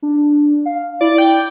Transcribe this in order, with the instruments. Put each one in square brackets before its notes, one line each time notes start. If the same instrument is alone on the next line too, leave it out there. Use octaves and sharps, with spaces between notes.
[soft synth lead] D4
F5
[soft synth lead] E4 [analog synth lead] D5
[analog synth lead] G5